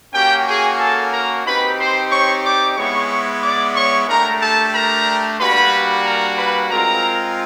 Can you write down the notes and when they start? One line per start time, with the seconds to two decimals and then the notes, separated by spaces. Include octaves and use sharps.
0.14 A#3 C#4 F#4 G4 G5
0.47 G#4 G#5
0.79 A4 A5
1.13 A#4 A#5
1.45 C4 D#4 G4 B4 B5
1.78 C5 C6
2.11 C#5 C#6
2.44 D5 D6
2.77 G#3 B3 E4 C#5 C#6
3.42 D5 D6
3.76 C#5 C#6
4.08 A3 D4 G4 A#4 A#5
4.41 A4 A5
4.74 A#4 A#5
5.40 G3 A#3 D4 F#4 B4 B5
6.06 A#4 A#5
6.38 B4 B5
6.71 G#3 C4 F4 A#4 A#5